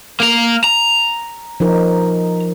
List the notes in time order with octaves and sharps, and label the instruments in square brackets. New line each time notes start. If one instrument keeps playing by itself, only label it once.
[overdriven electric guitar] A#3 A#4
A#5
[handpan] F3 D#4 A#4